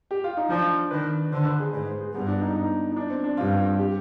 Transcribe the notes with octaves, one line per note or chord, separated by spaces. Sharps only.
G4
F4
D#4
F3 D4
D#3 B4
D3 C5
B4
G#4
G#2 B4
C5
G#4
G2 B3
D4
D#4
D#4
D#4
D4
C4
D4
G2 F4
G4